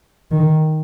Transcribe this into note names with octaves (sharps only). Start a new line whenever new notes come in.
D#3